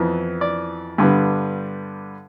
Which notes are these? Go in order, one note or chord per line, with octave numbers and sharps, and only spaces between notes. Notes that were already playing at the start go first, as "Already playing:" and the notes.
Already playing: F2 E3 B3
D5
G2 D3 G3 B3